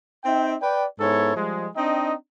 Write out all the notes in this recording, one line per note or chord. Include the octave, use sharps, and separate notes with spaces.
C4 D#4 E5 G5
B4 D5 G5
G#2 B3 E4 A4 C#5
F3 G3 G#3
C4 D4 D#4 D#5 G5